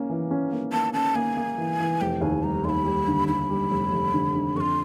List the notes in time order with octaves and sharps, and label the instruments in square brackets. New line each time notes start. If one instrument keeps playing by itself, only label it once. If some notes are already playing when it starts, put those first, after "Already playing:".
Already playing: [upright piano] A#3 C#4
E3
C#4
A#3
[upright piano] A#3 [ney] A5
[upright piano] C#4 [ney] A5
[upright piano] A#3 [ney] G#5
[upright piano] A#3
E3
E3
[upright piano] F1 [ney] G5
[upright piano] D#2 [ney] G#5
[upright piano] G3 [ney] A#5
[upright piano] D#2 [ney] B5 C6
[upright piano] G3
D3
[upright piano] D3 [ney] B5
[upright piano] G3
F1
F1
D3
D3
[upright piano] F2 [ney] C#6
[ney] C6